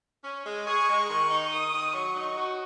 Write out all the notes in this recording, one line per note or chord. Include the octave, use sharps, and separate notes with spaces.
C#4
G#3
G#4 C#6
G#3
D#3 C#6
D#4
D#3 D#6
D#3
F#3 C#6
D#4
F#4